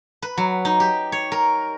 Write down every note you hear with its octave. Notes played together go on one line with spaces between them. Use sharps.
B4
F#3
D#4
G4
C#5
A#4